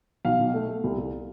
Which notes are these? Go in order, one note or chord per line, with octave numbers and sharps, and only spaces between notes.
B1 F5
B2
A3
A3
C2
C2